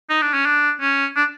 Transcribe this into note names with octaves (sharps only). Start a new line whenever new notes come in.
D#4
D4
C#4
D4
C#4
D4